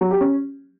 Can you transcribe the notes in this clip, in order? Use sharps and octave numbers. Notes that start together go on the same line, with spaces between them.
F#3
G4
C#4